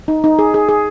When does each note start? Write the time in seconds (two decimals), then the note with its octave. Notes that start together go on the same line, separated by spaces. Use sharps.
0.08 D#4
0.24 D#4
0.39 G#4
0.54 G#4
0.69 G#4